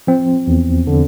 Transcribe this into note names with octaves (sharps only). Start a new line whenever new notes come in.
F3 C4
E2
D3